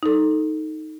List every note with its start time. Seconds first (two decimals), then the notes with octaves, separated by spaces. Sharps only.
0.03 D#4 A4